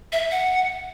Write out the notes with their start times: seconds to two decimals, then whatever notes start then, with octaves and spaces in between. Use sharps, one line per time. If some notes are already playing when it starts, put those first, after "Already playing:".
0.13 E5
0.31 F#5